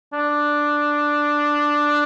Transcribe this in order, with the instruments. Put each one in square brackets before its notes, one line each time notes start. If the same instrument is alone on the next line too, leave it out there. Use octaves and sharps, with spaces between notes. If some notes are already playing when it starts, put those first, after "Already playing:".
[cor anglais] D4